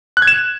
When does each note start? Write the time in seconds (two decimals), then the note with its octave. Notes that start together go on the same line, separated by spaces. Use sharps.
0.17 F#6
0.22 G#6
0.27 E7